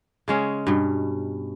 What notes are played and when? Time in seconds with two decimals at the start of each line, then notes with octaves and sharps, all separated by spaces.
0.28 C#3 G#3 C#4
0.67 G2 B2